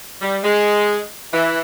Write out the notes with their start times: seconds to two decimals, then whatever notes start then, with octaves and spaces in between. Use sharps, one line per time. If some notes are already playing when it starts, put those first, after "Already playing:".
0.21 G3
0.43 G#3
1.33 E3